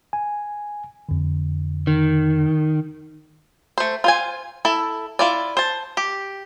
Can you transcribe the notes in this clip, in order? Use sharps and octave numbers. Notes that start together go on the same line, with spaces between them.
G#5
F2 D3
D#3
A3 C5
F4 C5 G#5
E4 A4
E4 F4 D5
C5 A5
G4